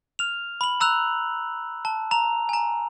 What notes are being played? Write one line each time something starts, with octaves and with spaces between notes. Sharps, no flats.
F6 F7
B5 F#7
A#5 E6 F#6 F7
A5
A#5 F7
G#5 A#5